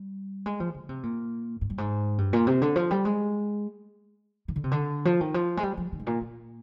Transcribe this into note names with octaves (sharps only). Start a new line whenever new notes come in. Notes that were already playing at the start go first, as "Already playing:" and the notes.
Already playing: G3
G#3
F3
D3
C3
A#2
G#2
G2
G#2
G2
A#2
C3
D3
F3
G3
G#3
D#3
D3
C3
D3
F3
D#3
F3
G#3
G3
F3
D#3
G#2
A#2
A#2